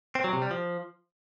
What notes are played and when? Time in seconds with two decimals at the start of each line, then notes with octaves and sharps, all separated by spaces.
0.15 C4
0.24 F#3
0.33 C3
0.42 G3
0.51 F3